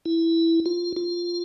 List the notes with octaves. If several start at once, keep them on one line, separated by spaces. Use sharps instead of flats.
E4
F4
F4